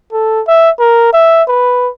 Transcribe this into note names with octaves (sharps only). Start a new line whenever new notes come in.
A4
E5
A#4
E5
B4